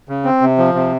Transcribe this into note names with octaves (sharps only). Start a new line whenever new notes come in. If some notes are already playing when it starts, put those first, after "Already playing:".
C#3
C4
C3
F3
C3